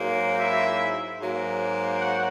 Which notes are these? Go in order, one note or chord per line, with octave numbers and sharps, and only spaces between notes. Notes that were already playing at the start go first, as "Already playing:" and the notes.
Already playing: G#2 F#3 A#3
E4 E5
G#2 F#3 A#3
F#4 F#5